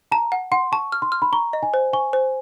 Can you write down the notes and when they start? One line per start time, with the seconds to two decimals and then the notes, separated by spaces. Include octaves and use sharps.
0.12 A5 A#5
0.32 F#5
0.52 F#5 C6
0.72 A5 C#6
0.92 F6
1.02 C6
1.12 F6
1.22 B5
1.32 A#5 C#6
1.53 D#5
1.63 G#5
1.74 C5
1.93 G#5 C#6
2.13 C5